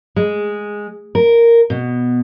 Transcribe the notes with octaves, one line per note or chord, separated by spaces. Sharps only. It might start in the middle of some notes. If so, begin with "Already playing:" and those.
G#3
A#4
B2